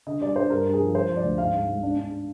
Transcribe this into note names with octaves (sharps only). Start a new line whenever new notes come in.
D3 D#5
G3 D5
D4 C5
G2 A#4
G2
G#4
F3
F3 C5
F3
D5
D2
G#2 F5
G#2
G#2
D4
D4